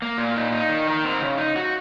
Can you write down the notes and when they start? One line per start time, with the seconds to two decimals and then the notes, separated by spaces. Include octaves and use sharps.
0.02 A#3
0.18 A#2
0.36 D#4
0.52 D#4
0.69 D#3
0.87 A#4
1.04 C4
1.22 C#3
1.37 D#4
1.56 F#4